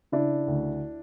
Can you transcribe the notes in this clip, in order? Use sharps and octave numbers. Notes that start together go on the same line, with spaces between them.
C#3 D4 E4
D2